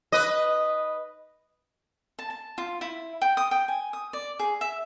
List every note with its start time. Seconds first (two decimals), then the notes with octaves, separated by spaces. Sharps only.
0.12 B4 D#5
2.19 A5
2.30 A5
2.58 F4
2.81 E4
3.22 G5
3.37 D#6
3.51 G5
3.68 G#5
3.93 D#6
4.13 D5
4.39 G#4
4.61 E5